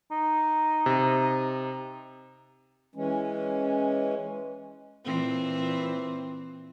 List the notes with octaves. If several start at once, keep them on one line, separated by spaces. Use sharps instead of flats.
D#4
C3
E3 G#3 C#4
A#2 E3 C4